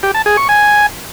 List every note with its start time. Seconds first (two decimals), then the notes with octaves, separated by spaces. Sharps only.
0.03 G4
0.15 A5
0.26 G#4
0.37 C#6
0.49 G#5